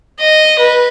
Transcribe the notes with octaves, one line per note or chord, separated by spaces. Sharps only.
D#5
B4